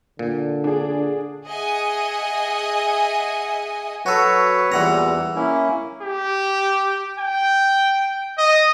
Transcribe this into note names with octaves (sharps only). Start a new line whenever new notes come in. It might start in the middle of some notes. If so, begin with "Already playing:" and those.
A#2 D3
D4 G#4
G#4 D#5 E5 F#5 G#5 D#6
F#3 F#4 A4 B4 C#5
E2 A#2 E3 G3 F#5 A#5
A#3 C#4 E4
G4
G5
D#5